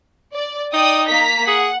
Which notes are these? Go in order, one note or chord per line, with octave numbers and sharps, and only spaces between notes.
D5
D#4 D5 G5 D#6
A#3 A#5 B6
G#4 F#5